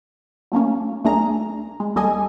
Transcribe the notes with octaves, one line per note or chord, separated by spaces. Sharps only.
F#3 A3 A#3 C#4
B1 A3 D4 G#4 A#4 A#5
G#3
D#2 G3 A4 D#5 G#5